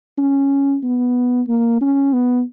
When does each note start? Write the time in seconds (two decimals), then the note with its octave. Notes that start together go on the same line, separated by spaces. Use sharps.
0.18 C#4
0.83 B3
1.48 A#3
1.81 C#4
2.13 B3